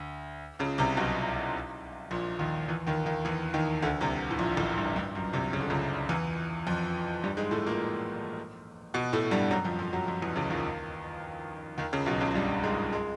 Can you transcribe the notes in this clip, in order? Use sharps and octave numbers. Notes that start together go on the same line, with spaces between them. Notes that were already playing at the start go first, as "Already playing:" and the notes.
Already playing: D2
C#2 C#3
C2 C3
B1 B2
A#1 A#2
D#2 D#3
E2 E3
D#2 D#3
D#2 D#3
E2 E3
D#2 D#3
D2 D3
C2 C3
A2
A#1 A#2
A1 A2
G2
G2
F#2
C2 C3
C#3
D3
C#2 C#3
E2 E3
F2 F3
G2 G3
G#2 G#3
A2 A3
A#2 A#3
B2 B3
A2 A3
G2 G3
F#2 F#3
F2 F3
F2 F3
F#2 F#3
F2 F3
E2 E3
C#2 C#3
D#2 D#3
D#2 D#3
C#2 C#3
B1 B2
C#2 C#3
G2 G3
G#2 G#3
G#3